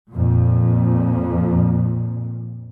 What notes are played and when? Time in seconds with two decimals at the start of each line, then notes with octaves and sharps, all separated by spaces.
0.11 F2 A#2